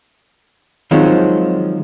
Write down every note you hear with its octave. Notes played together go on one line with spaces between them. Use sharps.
D#3 F3 F#3 G#3 C4